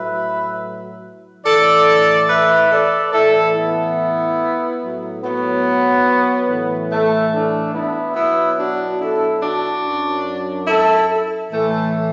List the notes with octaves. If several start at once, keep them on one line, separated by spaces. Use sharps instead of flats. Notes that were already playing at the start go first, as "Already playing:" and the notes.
Already playing: A2 F#3 B4 E5
A2 E3 A4 D5
B4 E5
A4 D5
A2 E3 E4 A4
B3 E4
A2 F#3
F#3 B3
A2 E3
A3
A3 D4
B3 E4
B2 F#3 B3 E4
D4 F#4
E4 A4
D4 F#4
F#2 F#3
E4 A4
A2 E3 A3